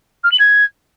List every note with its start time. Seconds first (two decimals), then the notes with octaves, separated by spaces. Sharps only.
0.23 F6
0.31 F#7
0.39 G#6